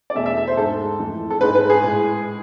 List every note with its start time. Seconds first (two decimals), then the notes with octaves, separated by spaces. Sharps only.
0.10 D5
0.15 E2 B2 A3 E5
0.26 E5
0.37 E5
0.47 C5
0.57 G#2 G#3 A4
0.99 F2 E3 A3
1.30 A4
1.41 G#2 G#3 B4
1.55 B4
1.70 G#4
1.83 A2 G#3